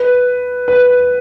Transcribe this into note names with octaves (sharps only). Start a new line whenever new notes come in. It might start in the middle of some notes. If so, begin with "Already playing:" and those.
Already playing: B4
B4